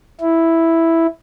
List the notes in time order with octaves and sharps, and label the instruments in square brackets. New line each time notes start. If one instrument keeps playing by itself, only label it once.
[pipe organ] E4